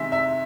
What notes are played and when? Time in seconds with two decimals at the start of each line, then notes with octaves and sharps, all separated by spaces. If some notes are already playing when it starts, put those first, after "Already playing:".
Already playing: C3 D#3 G#3 E5
0.12 E5